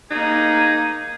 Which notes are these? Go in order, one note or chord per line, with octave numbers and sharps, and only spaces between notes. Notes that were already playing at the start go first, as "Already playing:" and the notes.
A#3 D#4 G#4